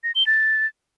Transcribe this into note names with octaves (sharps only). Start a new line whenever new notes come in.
A#6
G7
A6